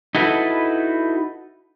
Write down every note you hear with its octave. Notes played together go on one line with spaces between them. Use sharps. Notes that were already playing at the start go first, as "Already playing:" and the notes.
D#4 E4 F#4 A4 B4